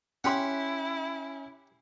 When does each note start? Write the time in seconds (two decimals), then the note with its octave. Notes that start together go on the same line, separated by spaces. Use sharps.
0.24 C#4 E4 G4 F#5 C6